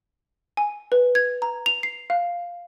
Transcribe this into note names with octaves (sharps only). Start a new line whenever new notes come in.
G#5
B4
G#6
A#5
F7
C7
F5